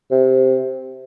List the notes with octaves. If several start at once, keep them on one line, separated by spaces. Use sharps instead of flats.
C3